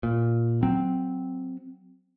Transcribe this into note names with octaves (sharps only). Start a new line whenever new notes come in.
A#2
F#3 C4